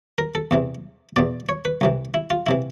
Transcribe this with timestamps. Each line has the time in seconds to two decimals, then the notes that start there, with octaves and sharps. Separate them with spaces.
0.18 A#4
0.35 A4
0.51 E2 C3 E3
1.16 E2 B2 D5
1.49 C#5
1.65 B4
1.81 C2 C3 E3
2.14 E4
2.30 F4
2.47 C3 E3 E4